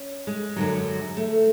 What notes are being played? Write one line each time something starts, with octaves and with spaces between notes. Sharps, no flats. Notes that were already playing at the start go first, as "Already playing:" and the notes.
Already playing: C#4
G#3
F#2 D3 F#3
A3